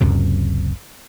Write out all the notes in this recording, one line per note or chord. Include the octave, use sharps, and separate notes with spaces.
F#1 C#2 F#2 C3